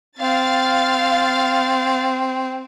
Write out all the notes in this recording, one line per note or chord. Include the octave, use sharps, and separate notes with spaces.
C4 F5 A6